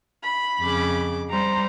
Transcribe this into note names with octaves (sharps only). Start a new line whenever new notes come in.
B5
F2 C#3 D6
G3 C5 A#5